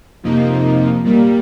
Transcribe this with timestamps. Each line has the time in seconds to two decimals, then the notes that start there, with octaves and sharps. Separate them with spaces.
0.23 F2 C3 F3 A#3 D#4
1.04 A#2 G3 A#3